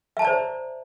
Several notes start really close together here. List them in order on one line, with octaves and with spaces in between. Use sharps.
E5 A5 A#5 D5 C5